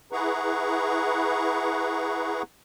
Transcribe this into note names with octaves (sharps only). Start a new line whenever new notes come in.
E4 G#4 B4 F#5 A#5 C#6